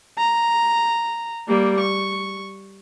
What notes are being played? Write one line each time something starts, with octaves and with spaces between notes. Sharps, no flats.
A#5
G3 A#3
C#6